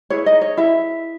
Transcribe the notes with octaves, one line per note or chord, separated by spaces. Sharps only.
E4 G#4 B4 C#5
D#4 D#5
C#5
E4 E5